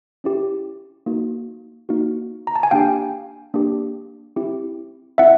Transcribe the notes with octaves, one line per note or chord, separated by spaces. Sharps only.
C#4 E4 G4
A#3 D#4 F#4
A#3 D#4 F#4
A#5
A5
G#5
A#3 D4 G4 F5 G5
A#3 D4 G4
C4 E4 G4
C4 E4 E5 F#5